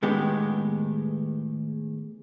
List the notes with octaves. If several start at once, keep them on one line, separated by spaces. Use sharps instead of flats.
A2 D#3 G#3 B3 G4